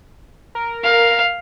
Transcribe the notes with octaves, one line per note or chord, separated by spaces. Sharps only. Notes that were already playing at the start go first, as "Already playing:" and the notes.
A#4
F5